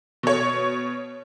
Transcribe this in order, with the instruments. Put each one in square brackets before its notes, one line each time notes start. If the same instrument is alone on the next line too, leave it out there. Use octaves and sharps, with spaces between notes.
[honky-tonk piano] B2 C#5